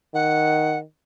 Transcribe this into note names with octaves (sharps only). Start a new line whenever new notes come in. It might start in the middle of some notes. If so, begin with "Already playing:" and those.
D#3 F#5